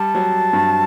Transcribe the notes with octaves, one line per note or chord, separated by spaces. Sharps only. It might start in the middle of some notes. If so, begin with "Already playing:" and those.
Already playing: G3 A5
F#3
G2